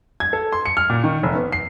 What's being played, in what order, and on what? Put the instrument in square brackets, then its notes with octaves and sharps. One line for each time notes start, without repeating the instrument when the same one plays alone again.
[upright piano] G#6
A4
C6
C#7
F6
A#2
D#3
F1
B3
C7